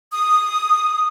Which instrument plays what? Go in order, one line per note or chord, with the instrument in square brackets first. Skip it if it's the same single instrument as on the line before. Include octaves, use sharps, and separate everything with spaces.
[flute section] D#6